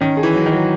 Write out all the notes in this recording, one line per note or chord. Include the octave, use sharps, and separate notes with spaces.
D#3 C#4
G#4
E3
F#3
D#3
F#3